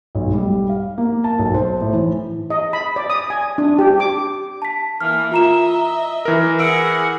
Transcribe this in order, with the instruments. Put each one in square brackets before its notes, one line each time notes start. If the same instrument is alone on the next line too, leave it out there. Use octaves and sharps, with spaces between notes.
[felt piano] B1
G3
F5
A#3
A5
B1
C5
A2
E3
[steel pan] D#5
B5
D5
D#6
G#5
D4
G4
D6
[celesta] A5 B6
[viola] E3 A#3 [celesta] F6
[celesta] F4 A#5 E7 [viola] D#5 E5
[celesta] A#5
[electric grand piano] E3 A#4
[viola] G#4 F#5 [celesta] E6 D7